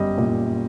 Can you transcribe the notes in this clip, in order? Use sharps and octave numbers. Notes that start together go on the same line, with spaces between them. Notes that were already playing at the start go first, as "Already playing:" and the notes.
Already playing: G1 F#2 G3 D#5
A#2